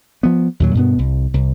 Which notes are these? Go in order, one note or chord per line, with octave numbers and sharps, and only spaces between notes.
F3 B3
D#2 A#2 F#3
G2 B2 B3
C2
C2